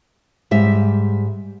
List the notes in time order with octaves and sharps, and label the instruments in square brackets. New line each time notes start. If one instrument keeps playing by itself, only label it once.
[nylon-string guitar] G#2 G3 E5